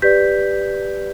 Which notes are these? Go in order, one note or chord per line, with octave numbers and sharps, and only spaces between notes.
G4 B4 D5 G6 B6